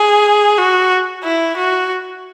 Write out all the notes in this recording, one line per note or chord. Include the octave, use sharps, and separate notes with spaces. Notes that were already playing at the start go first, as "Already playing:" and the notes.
Already playing: G#4
F#4
E4
F#4